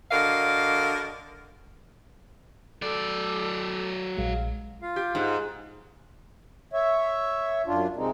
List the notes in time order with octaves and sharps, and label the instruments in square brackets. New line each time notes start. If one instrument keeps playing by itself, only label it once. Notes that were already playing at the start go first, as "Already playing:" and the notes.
[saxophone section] D3 F#4 A#4 D#5 F5
[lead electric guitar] F#3 D5 [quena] A4
[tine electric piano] A#1 G#3 [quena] F5
[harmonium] F4 F5
[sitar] G4
G#2
[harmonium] C#5 E5
F#2 D4 F4
C3 G#3 C4 D#4